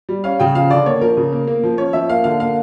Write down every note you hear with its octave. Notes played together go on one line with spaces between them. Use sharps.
G3
C#4 F5
C#3 G5
F3 F5
D3 D5
A#3 C#5
F3 A#4
C#3
A#3
A#3
F3
C#4 C#5
F3 E5
A#3 F5
D3 F5
A#3 F5